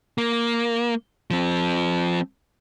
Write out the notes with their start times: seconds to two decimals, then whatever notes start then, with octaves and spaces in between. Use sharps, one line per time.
0.18 A#3
1.31 F3 C4